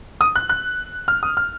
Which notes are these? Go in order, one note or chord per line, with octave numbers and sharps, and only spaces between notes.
D#6
F#6
F#6
F6
D#6
F6